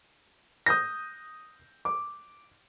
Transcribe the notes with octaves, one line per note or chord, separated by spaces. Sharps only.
D#6 G6 A#6
D6